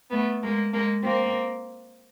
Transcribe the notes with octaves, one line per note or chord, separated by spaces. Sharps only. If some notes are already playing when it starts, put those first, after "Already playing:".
A3 B3
G#3 A#3
G#3 A#3
A#3 C4